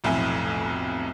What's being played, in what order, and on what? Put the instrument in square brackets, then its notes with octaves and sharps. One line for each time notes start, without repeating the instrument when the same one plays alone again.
[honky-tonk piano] F1 B1 F2 A2 E5 G#5